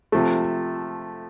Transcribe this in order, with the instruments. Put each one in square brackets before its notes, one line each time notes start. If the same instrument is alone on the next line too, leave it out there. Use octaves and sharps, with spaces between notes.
[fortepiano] C3 F3 A3